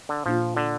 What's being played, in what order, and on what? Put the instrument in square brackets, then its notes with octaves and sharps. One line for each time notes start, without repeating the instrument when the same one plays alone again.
[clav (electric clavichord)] D3
[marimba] A#2 A#3 D4 F4 [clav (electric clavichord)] F3
[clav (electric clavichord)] D3